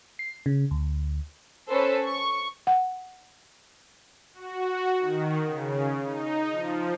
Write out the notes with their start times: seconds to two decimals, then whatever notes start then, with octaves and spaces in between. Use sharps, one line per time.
0.19 C7
0.46 C#3
0.71 D2
1.69 C#4 A4 B4 C5
2.06 C#6
2.67 F#5
4.34 F#4
4.99 D#3
5.46 C#3
6.03 D#4
6.52 F3